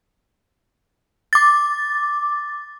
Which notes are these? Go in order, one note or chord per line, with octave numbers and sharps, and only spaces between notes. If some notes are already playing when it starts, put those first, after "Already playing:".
D6 A6